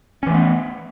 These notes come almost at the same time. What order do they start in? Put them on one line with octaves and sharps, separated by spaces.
C#4 E3 A3 B3